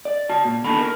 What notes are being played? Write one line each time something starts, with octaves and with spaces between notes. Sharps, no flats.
D5
F#4 A5
A#2
D#2 B2 D3 A5 B5
A#4